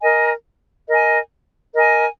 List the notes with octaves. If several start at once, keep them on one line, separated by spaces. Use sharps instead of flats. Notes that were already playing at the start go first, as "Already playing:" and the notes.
A#4 D#5 G#5
A#4 D#5 G#5
A#4 D#5 G#5